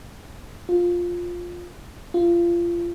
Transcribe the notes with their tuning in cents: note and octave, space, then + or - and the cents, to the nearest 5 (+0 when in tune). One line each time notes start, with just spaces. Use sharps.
F4 +10
F4 -25